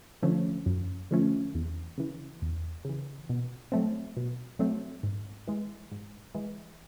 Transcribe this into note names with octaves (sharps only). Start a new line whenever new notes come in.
D3 F3 A3 C#4
F#2
D3 F3 A3 C#4
E2
C#3 E3
E2
C#3 E3
B2
F#3 A3 C4
B2
F#3 A3 C4
G#2
E3 G#3
G#2
E3 G#3